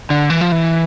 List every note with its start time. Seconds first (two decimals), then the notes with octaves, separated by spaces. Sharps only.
0.10 D3
0.30 E3
0.41 F3
0.52 E3